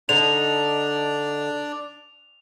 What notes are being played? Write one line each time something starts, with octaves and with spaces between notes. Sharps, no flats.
D3 D4 D#4 D5 F7